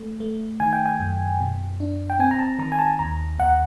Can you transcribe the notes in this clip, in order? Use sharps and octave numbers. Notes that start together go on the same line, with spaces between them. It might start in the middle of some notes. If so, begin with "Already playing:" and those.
Already playing: A3
A3
D#3 G#5
G5
G#5
F#2
B2
D4
G5
C4 G#5
A#5
A5
D#3 A#5
G#5
A5
D#2 A#5
D#2 F#5